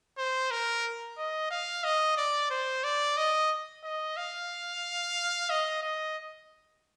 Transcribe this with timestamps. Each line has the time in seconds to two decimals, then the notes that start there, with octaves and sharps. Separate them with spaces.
0.18 C5
0.51 A#4
1.18 D#5
1.51 F5
1.84 D#5
2.17 D5
2.51 C5
2.84 D5
3.17 D#5
3.84 D#5
4.17 F5
5.50 D#5
5.82 D#5